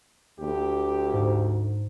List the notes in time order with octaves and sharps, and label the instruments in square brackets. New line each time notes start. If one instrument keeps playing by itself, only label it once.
[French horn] D2 [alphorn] G4
[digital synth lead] G#2